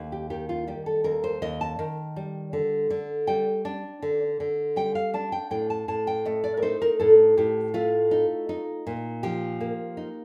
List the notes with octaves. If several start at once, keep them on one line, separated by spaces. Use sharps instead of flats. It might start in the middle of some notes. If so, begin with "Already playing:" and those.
Already playing: D#2
G4
D#3 G4
F4
G3 G4
A4
D#2 A#4
C5
D#2 D#5
A5
D#3
G3
D3
D3
G3 G5
D4
D3
D3
G3 G5
F5
D4 A5
G5
A2 G5
A5
A2 A5
G5
A3 D#5
D5
A#4
D#4 C5
A#4
A2 A4
A2 G4
A3 F4
D#4
D#4
A#2
F3 G4
A#3
D#4